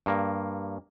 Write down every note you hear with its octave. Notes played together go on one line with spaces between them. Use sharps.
G2 A#3